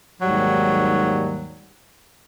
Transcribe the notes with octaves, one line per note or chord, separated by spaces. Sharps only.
D#2 G#2 F#3 G3